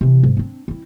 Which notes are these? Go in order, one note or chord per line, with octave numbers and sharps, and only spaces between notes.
C3 E3
G#2
C4 D4
C4 E4